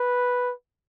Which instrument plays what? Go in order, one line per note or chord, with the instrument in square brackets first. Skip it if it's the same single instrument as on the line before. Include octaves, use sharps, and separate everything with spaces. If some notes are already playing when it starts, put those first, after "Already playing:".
Already playing: [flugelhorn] B4